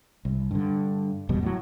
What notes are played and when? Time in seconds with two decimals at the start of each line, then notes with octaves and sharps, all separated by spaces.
0.25 C2
0.51 G2 D3
1.29 F#1 E2 B2 G3
1.43 A2 F#3